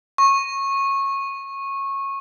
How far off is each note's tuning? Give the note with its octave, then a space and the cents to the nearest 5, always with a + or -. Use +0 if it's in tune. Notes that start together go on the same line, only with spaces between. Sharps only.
C#6 -20